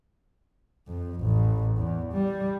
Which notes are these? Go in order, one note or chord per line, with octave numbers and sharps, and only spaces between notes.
F2
A1
E2
G3